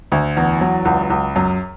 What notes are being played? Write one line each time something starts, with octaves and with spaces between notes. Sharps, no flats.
D2
E2
F#3
C#2
C#2
F#2